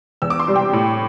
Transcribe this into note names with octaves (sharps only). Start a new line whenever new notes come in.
E2 E6
D6
C6
C3 G3
G5
A2